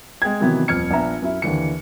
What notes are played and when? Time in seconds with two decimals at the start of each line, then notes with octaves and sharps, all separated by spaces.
0.22 G#3 G5 G#6
0.40 C3 D#3 E3 F#3 B3
0.68 D#1 F2 F6 G#6 C#7
0.91 A#1 B3 D4 E5 A#5
1.22 F#2 E4
1.42 D#2 D3 E3 C#7